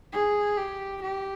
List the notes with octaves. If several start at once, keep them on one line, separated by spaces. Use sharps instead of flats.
G#4
G4
G4